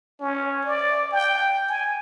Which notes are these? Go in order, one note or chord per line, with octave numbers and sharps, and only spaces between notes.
C#4
D5
G5
G#5